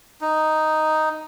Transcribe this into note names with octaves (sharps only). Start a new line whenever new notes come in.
D#4